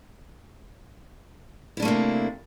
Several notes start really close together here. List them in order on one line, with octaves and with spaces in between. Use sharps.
E4 D4 A3 A#3 C3